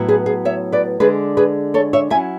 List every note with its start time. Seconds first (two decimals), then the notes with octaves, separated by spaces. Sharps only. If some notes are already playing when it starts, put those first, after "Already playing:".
Already playing: A2 F#3 B3 E4
0.08 G#4 B4
0.26 G#4
0.45 C#5 E5
0.72 B4 D5
1.00 D3 G#3 D4 G#4 B4
1.37 G#4 B4
1.74 A4 C#5
1.93 C#5 E5
2.10 F#3 C#4 E4 E5 G#5